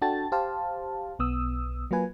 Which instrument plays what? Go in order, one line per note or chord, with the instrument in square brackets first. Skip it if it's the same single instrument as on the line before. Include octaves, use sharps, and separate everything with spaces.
[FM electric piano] D4 F#4 A4 G5 A5 A6
G4 C5 F5 A5
B1 B3 D#6 E6
F#3 A#3 F4 B4 G#5